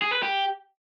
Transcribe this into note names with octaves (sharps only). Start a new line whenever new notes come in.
G#4
B4
G4